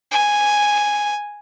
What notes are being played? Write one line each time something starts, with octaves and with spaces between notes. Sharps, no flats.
G#5